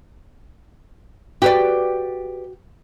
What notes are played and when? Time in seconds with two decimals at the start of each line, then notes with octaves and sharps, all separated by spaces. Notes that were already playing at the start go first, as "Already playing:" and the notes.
1.42 F#4 G4 B4 D5 G5